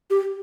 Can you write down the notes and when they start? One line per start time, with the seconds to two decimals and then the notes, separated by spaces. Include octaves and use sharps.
0.10 G4